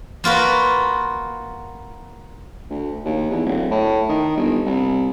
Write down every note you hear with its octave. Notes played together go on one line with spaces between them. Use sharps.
A#3 F4 F#4 B4
D2
D#2
E2
D1
A2
D#3
G1
C2